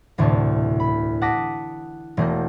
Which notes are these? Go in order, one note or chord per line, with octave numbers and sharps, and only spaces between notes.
E1 D2 A2 C3 A5 C#6
B5
F#5 A5 D6 D#6 A#6 B6
E1 A3 A#3 G6